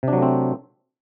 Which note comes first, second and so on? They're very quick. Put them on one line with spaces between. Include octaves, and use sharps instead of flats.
C3 D4 F#3 A3 C4